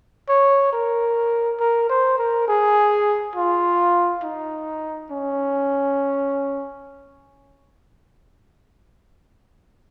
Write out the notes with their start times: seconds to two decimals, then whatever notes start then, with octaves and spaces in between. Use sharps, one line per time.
0.29 C#5
0.73 A#4
1.60 A#4
1.90 C5
2.18 A#4
2.48 G#4
3.36 F4
4.23 D#4
5.12 C#4